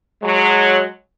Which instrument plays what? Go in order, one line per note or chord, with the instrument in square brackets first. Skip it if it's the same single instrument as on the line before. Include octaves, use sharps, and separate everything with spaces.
[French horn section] F#3 G#3